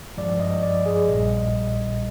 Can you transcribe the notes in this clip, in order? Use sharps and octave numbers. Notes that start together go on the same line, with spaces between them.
G2 F3 G#3 D5
D#5
D5
G#4
A#1 A#2 G3 D#5